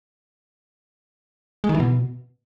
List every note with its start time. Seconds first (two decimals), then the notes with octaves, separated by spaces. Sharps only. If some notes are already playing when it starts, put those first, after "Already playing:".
1.64 G#3
1.69 D#3
1.74 E3
1.80 B2